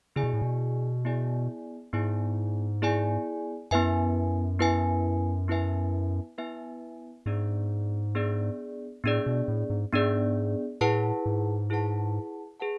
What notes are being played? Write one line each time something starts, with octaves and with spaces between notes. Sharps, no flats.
C#3 B3 E4 G#4 D5 G#5
B2
A2
B2
B3 E4 G#4 D5 G#5
G#2 B3 E4 G#4 D5 G#5
B3 E4 G#4 D5 G#5
F#2 B3 E4 B4 E5 G#5
B3 E4 B4 E5 G#5
B3 E4 B4 E5 G#5
B3 E4 B4 E5 G#5
G#2 B3 D4 G#4 D5
B3 D4 G#4 D5
A2 B3 D4 G#4 D5
B2
A2
G#2
G#2 B3 D4 G#4 D5
A2 E4 G#4 B4 F#5 A5
G#2
E4 G#4 B4 F#5 A5
G#4 B4 F#5 A5